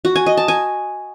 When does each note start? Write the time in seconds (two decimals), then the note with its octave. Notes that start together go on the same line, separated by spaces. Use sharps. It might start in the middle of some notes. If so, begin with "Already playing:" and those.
0.05 F#4
0.16 G#5
0.26 D#5
0.37 A5
0.48 G#5